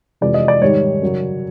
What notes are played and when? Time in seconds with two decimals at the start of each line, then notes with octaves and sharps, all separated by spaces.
0.21 F2 C3 E3 G#3 D5
0.34 D#5
0.48 D5
0.61 G#2 D#3 G3 C#5
1.02 F#2 C#3 F#3